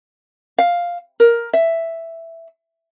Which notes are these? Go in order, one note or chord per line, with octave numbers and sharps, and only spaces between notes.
F5
A#4
E5